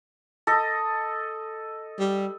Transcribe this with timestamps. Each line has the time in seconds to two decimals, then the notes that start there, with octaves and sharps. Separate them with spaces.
0.47 A4 D#5
2.00 G3